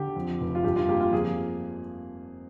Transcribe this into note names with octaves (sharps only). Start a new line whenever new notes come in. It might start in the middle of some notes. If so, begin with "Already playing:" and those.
Already playing: D3 G4
F2
F1
F4
G2 G4
F4
A#3 G4
F4
F2 G#4